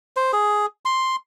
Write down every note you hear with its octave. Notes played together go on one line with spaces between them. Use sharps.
C5
G#4
C6